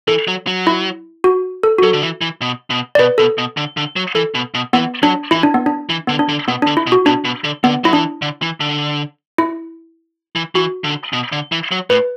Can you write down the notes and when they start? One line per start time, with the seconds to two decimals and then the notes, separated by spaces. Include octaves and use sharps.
0.08 E3 A4
0.28 F#3
0.47 F#3
0.67 E4
1.24 F#4
1.63 A4
1.78 F#4
1.83 F#3 A4
1.93 D3
2.02 E3
2.21 E3
2.41 B2
2.70 B2
2.95 D5
2.99 B2 B4
3.18 B2 A4
3.38 B2
3.57 D3
3.77 D3
3.96 F#3
4.15 E3 A4
4.35 B2
4.54 B2
4.73 E3 B3
5.03 F#3 D4
5.31 E3 E4
5.43 D4
5.54 B3
5.66 D4
5.89 E3
6.07 D3 B3
6.19 D4
6.29 D3
6.48 B2 B3
6.62 D4
6.67 D3
6.77 E4
6.87 B2
6.92 F#4
7.06 B2 D4
7.25 B2
7.44 D3
7.64 D3 B3
7.84 F#3 E4
7.93 E3 D4
8.22 D3
8.42 E3
8.60 D3
9.38 E4
10.36 E3
10.55 E3 F#4
10.84 D3
11.13 B2
11.32 D3
11.52 E3
11.71 F#3
11.90 A2 B4